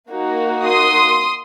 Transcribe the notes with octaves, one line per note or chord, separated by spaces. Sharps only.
A#3 D#4 F#4
C6 D#6